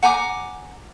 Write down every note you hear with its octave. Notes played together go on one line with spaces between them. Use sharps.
F#5 G#5 A#5 D6